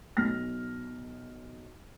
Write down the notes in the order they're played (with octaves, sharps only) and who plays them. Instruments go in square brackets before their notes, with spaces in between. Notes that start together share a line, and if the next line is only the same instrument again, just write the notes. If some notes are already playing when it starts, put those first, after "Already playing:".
[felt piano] B1 F6 A#6